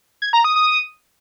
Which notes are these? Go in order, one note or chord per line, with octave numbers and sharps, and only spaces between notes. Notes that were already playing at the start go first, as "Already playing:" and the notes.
G#6
A#5
D#6
D#6